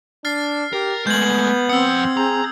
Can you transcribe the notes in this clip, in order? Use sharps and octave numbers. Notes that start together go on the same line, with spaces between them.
D4 F6 A6 C7
G4 A#4
G#3 A3 B3 G6 G#6 F#7
F2 C4 F#5 D#6 E6
G#4 A#5